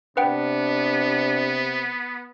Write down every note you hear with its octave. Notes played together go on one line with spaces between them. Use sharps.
C3 B3 D4 B4 F#5 G5